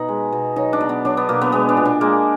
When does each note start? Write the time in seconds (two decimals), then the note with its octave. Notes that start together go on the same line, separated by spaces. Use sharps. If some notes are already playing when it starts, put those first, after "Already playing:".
Already playing: B2 D#4 B4
0.09 G#3
0.33 B2
0.56 F#3 D#4
0.73 D4
0.81 B2
0.89 B3
1.05 F#3 D4
1.17 B3
1.29 B2 A#3
1.41 B3
1.52 G#3 B3
1.69 D4
1.77 A#2
1.85 D4
2.01 G#3 A#3